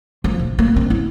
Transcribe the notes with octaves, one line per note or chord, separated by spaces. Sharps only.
F3
A#1
A#3
C4
E4